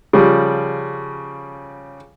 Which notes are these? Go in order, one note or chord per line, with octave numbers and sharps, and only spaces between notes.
C#3 F3 G3